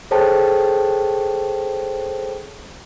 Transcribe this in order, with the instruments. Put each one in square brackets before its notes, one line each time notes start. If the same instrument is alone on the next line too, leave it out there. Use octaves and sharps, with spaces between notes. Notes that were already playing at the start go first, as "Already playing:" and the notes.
[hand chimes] G#4 A4 C5 C#5 G5 A5